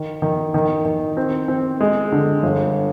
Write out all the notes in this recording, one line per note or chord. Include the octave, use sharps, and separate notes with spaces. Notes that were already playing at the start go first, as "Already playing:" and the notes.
Already playing: D#3
D#3
D#3
D#3
C4
C4
G#3
D3
G1